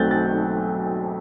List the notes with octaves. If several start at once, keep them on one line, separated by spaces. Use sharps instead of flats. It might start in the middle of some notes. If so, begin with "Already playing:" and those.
Already playing: B1 A3 C4 F#6 G6 A6
A6